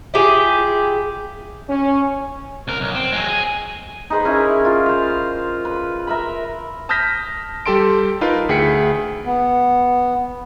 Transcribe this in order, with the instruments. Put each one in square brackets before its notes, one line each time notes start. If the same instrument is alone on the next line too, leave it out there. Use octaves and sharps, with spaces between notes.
[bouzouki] E4 F4 G4 G#4
[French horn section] C#4
[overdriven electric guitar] C2 A#4
B1
C4
F#3 G#3
G#4
[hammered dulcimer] D#4 G#4 B4 C5
C#4 E4 A#4
F4
C5 F5
B4
A#4 E5 B5
[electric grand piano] A5 D#6 F6 G6 A#6 B6
G3 G4 A4 A5 C6 D7
D#4 F4 A#4 B4 F5
D2 G#4 G5 B6 C#7
[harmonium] B3